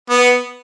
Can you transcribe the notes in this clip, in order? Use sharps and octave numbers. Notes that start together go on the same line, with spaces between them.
B3